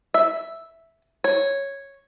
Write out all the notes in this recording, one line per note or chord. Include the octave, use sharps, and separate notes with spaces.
E5
C#5